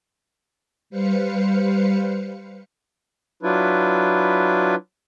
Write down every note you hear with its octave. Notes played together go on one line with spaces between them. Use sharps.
G3 B4 C5 F5 C#7
F#3 D4 E4 F4 B4